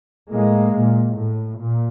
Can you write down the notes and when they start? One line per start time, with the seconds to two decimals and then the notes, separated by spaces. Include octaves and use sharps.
0.30 A2 G#3 A#3
0.74 A#2
1.17 A2
1.60 A#2